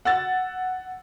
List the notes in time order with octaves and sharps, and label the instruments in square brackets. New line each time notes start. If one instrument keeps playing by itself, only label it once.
[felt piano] F#5 E6 A6